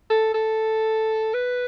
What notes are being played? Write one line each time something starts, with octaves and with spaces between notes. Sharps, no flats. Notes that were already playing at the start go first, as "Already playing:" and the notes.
A4
A4
B4